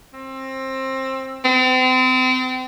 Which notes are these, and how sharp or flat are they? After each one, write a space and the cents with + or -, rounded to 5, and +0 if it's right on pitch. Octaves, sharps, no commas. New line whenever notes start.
C4 +20
C4 -35